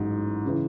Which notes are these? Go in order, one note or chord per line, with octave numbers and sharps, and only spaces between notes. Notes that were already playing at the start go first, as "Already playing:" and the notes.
Already playing: A1 G#2 F#3
C#3 E3